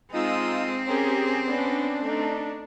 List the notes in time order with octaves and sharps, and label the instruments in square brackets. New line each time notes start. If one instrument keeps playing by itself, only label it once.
[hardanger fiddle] G#3 D#6 [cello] C4 [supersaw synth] D#4 F4 E6
[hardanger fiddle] C#4 A#4 [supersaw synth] G4 G#4
[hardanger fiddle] B3 C#4 [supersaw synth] D4
[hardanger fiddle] A3 D#4